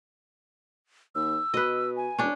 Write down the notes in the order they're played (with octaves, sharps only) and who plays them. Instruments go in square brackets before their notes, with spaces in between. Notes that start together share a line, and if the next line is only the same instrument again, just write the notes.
[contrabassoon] D#2 [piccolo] E6
[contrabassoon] B2 [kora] B4 D#5
[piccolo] G#5
[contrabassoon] E1 [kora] C#4 D4